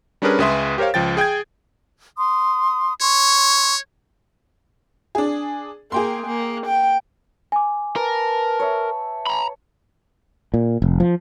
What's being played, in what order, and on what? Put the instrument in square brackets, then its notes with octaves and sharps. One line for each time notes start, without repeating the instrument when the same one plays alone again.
[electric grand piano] G3 C#4 D4 G#4 A#4 B4
C#2 G#3 G#4 B4 E5 C6
G4 A#4 C5 C#5 F5
C#2 F3 G5 A6
G#4 G5 G6 G#6
[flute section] C6 D#6
[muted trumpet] C#5 [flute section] C6 C#6
[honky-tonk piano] D4 G#4
[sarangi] A#3 [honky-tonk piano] G#4 G5 C6
[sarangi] A#3
G5
[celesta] G#5 D6
[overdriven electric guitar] A#4 [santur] B4 A5
[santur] C#5 E5
[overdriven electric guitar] A#5 B5
[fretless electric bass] A#2
F1
F3